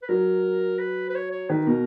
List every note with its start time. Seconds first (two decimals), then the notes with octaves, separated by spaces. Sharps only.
0.02 B4
0.09 F#3 A#4
0.79 B4
1.10 B4
1.15 C#5
1.31 C#5
1.49 D#3 B4
1.67 B2 A#4